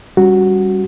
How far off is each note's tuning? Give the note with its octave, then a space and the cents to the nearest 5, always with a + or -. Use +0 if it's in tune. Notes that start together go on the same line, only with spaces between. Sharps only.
G3 +0 C#4 +0 F#4 +0